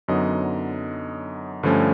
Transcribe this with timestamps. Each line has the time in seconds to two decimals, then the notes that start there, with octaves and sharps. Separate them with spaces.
0.08 F#2 D3 F#3 B3 D#4 D#5
1.63 G2 D3 F3 A3 C#4